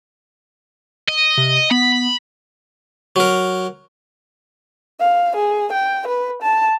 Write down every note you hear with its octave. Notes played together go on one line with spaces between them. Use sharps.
D#5
C3
B3 B5
F#3 A#4
F5
G#4
G5
B4
A5